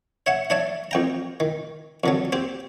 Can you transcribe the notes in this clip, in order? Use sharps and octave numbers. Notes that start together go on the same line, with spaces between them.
C#5 E5 F#5
D4 C#5 D5 E5
F2 G5 A#5
D#3
F2 D3 F#3
C4 G4